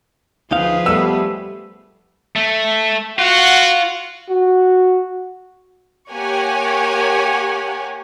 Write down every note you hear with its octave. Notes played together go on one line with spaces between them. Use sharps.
D2 F3 D#4 G#4 B4 F5
G3 A3 B3 E6
A3
F4 F#4 F#5
F#4
A#3 G4 C#5 F#5 G#5